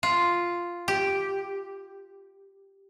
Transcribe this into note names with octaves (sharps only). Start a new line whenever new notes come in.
F4
G4